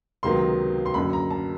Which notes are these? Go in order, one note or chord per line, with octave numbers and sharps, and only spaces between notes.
C#2 C3 D#3 F#3 B3 C6
C6
F#1 F#2 D3 B5
A#5
A5